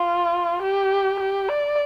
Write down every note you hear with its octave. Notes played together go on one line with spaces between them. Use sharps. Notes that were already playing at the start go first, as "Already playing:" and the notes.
Already playing: F4
G4
G4
D5